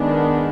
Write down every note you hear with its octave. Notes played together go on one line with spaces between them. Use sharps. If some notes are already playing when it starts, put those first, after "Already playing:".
Already playing: D#3 G#3 B3 D4